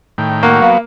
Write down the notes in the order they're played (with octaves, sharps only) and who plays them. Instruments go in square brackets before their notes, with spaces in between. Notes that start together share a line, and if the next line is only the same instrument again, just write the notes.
[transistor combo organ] A2 D#3 G5
[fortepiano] A#3 [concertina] F#4 F#5
[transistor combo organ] F#3 B3 [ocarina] F5